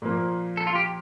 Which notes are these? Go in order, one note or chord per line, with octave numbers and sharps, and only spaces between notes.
A#2 F3 A#3
A4
F4
G4